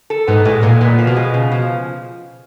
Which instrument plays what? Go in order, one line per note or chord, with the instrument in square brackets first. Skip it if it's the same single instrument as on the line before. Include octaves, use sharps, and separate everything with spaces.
[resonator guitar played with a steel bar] A4
[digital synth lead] G#2 [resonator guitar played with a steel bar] B3
[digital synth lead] A2 [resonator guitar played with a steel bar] G#3
[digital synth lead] A#2 [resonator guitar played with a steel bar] G#3
[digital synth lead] A#2 [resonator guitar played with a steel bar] B3
[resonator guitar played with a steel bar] F3
[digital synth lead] B2
[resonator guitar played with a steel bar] G#3
C#3
F3